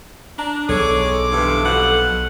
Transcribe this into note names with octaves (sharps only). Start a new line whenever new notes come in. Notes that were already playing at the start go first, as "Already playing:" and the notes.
D4 A#5
B1 G#3 G#4 A4 C#5 D6
G2 C3 E3
B2 F3 F#5